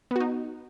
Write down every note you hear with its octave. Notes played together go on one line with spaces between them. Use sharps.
B3 D#4 F#4